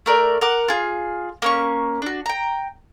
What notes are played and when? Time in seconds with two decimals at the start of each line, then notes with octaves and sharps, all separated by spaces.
0.06 A3 A#4 D5
0.41 A#4 F#5 D6
0.68 F4 G#4
1.42 A#3 C#4 C#6
2.02 D4 F#4
2.26 G5 A#5